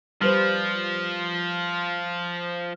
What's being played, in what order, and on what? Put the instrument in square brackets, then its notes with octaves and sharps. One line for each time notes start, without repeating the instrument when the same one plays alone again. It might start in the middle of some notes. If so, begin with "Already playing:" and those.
[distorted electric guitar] F3 [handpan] G3 B4 C5 [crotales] F6